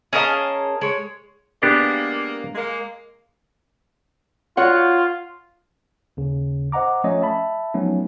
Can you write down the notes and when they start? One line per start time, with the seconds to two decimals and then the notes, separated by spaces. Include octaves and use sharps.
0.13 C#4 G#4 A#4 D#5 F5 A5
0.81 G#3 C#5
1.63 G#3 A#3 B3 D4 G4
2.55 G#3 A#3
4.57 F4 F#4 C#5 F#5
6.17 D#2 C#3
6.72 C5 D#5 F#5 A#5 D6
7.04 F3 A3 C#4 C#5 D#5
7.22 E5 A5 B5
7.74 F3 F#3 A3 B3 C#4 D#4